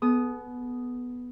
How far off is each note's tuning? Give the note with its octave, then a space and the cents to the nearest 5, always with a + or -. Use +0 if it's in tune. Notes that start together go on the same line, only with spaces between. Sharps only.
B3 +0 A4 -45 D#6 +0